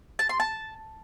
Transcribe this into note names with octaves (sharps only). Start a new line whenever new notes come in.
A5
C6
A5